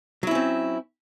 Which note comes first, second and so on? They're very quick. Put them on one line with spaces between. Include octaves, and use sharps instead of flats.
F#3 E4 C#4 C4